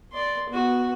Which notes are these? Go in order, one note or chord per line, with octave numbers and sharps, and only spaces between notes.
D5 C6
B3 F#4